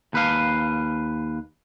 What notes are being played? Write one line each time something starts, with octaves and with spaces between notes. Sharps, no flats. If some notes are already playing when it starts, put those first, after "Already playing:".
D#2 B4 F5